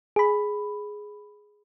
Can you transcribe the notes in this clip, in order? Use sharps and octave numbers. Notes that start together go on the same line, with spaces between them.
G#4 B5